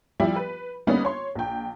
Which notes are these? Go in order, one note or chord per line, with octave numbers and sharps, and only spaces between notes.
F3 G3 E4 G4 D5
B4
D3 G3 A#3 B3 C#4 D#4
C#5 C6
A#1 G5